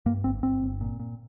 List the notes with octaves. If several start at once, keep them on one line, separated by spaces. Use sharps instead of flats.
G2 A#3
G1 C4
G1 C4
G1
A#2
A#2